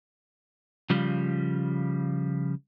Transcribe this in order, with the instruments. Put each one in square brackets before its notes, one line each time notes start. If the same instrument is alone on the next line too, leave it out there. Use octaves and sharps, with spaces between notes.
[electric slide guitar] C#3 F3 G3